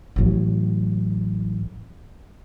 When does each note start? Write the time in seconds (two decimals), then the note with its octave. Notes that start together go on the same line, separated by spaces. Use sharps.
0.16 A1 F#3